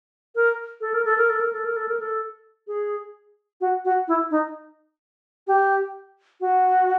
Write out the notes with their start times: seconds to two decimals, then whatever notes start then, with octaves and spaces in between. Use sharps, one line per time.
0.35 A#4
0.81 A4
0.94 A#4
1.05 A4
1.18 A#4
1.29 A4
1.40 A#4
1.53 A4
1.65 A#4
1.76 A4
1.88 A#4
2.00 A4
2.67 G#4
3.61 F#4
3.85 F#4
4.08 E4
4.31 D#4
5.47 G4
6.41 F#4